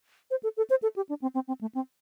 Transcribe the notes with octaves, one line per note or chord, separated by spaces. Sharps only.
C5
A4
A4
C5
A4
G4
D4
C4
C4
C4
A3
C4